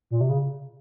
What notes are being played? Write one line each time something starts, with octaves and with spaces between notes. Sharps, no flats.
A#2
C3
C#3